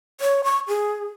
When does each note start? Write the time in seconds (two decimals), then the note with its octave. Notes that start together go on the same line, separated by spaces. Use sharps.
0.21 C#5
0.44 C#6
0.68 G#4